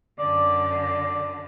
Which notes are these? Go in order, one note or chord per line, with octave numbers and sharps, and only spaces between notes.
F#2 D3 D5
D5